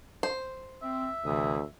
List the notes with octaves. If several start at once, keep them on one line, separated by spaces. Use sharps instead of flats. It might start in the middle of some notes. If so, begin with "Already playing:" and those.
C5
C4 E5
D2 C3 E3 D#6